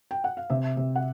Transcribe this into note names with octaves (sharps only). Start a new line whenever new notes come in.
G5
F#5
F5
C3 E5
C3
F#5